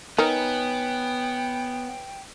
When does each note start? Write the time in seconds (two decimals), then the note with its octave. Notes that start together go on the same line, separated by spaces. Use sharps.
0.18 B3 D#4 A#4 B4 C#5 G5 G#5